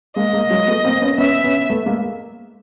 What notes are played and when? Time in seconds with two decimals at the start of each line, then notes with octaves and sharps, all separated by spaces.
0.16 G#3 A#3 D#5
0.33 G#3 A#3
0.50 F#3 G#3
0.68 A3 B3
0.84 A#3 C4
1.01 B3 C#4
1.18 B3 C#4 E5
1.44 B3 C#4
1.70 A3 B3
1.86 G#3 A#3